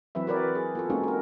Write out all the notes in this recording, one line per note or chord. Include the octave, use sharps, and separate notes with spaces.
E3 F#3 C4 B4 E5
F#4 A#4 B4 C#5 D5
G#4
B3 F4 A4
G#3 A#3 C4 C#4 D#4 F#4
F#4 A#4